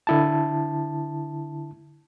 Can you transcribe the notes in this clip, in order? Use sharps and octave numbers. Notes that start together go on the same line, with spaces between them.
D3 E4 A5